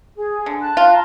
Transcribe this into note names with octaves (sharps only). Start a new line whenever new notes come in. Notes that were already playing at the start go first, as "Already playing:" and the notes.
G#4
D3
A5 F#6
F4
A5 A#5